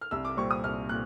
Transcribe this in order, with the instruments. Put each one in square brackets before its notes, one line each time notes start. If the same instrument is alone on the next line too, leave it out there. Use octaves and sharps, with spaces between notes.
[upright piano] F6
[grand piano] C2 [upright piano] E6
[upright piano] D6
[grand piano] A#2 G3 C4 [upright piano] C#6
[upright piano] D#6
[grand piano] C2 [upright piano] F6
[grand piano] A#2 [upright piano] F#6